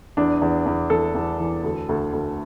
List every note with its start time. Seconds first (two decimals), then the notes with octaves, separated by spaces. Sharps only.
0.17 E2 D4
0.42 E2
0.66 E2
0.90 E2 A4
1.15 E2
1.40 E3
1.64 D2
1.89 D2
2.13 D2